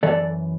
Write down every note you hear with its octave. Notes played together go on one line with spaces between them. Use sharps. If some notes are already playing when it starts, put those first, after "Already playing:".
F#2 E3 A4 D5